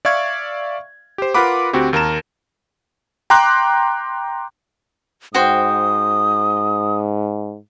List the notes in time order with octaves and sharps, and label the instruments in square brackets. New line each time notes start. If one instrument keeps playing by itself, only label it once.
[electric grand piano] D5 E5 F5 C#6 G#6
G4 C5
F4 A#4 B4 F#5 B5 D6
D2 C4 F#4 G4
D#2 A#4 A5 A#5 E7
G5 A#5 C6 D6 F#6
[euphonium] G#2 [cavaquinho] F#4 C5 G5 [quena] D#6